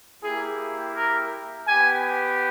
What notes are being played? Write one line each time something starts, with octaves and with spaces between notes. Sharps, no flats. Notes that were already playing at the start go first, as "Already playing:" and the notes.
A#3 E4 G4 G#4
A#4
B3 G4 G#5